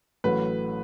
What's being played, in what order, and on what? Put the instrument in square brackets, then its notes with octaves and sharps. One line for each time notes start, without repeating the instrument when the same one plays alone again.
[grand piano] A1 A2 F#3 A3 B4